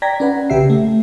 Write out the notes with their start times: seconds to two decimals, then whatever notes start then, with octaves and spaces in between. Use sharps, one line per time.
0.02 D5 G5 A#5 G#6 A#6 B6
0.20 C#4 B4 F#5
0.50 A#1 C#3 G4 E5 C7
0.70 A3